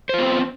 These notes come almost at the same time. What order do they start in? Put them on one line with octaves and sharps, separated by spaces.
C5 F4 B3 C4